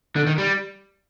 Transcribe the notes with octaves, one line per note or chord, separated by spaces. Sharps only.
D3
D#3
G3